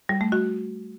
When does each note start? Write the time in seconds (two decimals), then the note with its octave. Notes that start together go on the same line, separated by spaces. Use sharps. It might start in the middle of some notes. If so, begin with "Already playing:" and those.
0.09 G3
0.21 A3
0.32 F#4